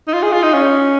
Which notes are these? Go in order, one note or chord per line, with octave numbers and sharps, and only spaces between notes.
D#4
F4
G#4
F4
D#4
C#4